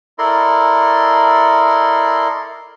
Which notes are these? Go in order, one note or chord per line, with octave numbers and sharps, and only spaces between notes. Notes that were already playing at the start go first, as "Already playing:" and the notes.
E4 A4 A#4 D5 D#5 C6